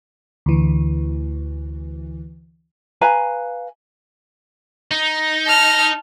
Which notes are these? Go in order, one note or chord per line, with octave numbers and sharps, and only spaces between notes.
D2 E3
B4 F5 G#5 A#5
D#4
A5 F6